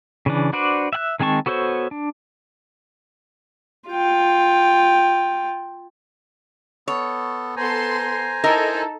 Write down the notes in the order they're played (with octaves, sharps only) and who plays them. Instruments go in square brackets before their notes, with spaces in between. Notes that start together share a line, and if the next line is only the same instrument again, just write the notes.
[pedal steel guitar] C#3 E3 D4
D4 F#4 B4 C5 D5
E5 F#5 F#6
D#3 G#3 C4 A5 C#6
B3 F#4 A4 C5 C#5
D4
[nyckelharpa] F4 G5
[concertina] B3 A4 [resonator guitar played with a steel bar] C#5
[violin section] B3 A4 C6 [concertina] C5 G#5 A#5
[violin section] D#4 A4 [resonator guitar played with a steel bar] E4 A#4 D#5